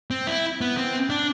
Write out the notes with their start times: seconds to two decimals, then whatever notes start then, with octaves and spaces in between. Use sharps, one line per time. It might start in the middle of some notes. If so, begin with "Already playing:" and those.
0.11 C4
0.27 E4
0.61 B3
0.77 C4
1.10 D4